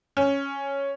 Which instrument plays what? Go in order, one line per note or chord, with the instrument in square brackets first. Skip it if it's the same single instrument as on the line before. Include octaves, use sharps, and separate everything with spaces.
[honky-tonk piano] C#4